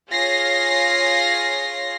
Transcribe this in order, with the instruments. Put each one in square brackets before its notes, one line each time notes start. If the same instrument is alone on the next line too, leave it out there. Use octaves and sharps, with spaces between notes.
[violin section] F4 G#4 C#5 F5 A#6 C7